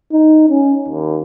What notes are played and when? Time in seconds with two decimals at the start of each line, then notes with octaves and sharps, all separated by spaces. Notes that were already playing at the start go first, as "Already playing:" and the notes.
0.12 D#4
0.49 C#4
0.88 D#2